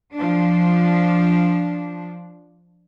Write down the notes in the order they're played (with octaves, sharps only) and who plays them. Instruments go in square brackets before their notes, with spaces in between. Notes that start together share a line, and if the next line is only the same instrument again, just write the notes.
[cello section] F3 D4